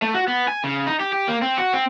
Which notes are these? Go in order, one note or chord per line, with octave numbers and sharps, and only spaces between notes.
A3
F#4
B3
G#5
C#3
D#4
G4
G4
A#3
C4
F#4
C4